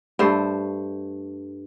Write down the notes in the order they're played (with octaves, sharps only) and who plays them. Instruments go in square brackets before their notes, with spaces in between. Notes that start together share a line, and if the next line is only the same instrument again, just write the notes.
[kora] G2 A3 C5